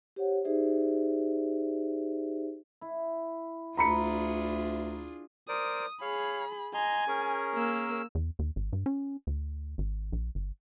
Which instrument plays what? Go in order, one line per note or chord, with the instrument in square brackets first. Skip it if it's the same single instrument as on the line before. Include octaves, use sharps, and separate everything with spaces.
[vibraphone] G4 C5 C#5 F#5
D#4 G4 G#4 C5 D5 E5
[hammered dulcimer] E4
[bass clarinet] D2 [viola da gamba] D4 F4 G#4 [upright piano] A#5 B5 C#7
[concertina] A#4 C5 D5 [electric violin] D#6
[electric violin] G#4 B5 [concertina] C#5 F5
[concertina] D#5 A#5 C6 [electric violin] G#5
[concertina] C#4 G#4 A#4
[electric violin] A#3 E6
[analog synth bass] E2
D#2
G#1
G2
C#4
D2
G#1
A#1
G1